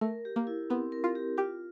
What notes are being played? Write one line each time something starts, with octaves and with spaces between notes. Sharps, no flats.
A3 A#4
G4
A#3
E4
B3 C4
A#4
F4
G4
F4 G4